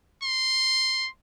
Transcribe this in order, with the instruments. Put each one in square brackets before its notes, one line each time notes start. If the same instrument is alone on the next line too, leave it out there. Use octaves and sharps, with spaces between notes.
[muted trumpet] C6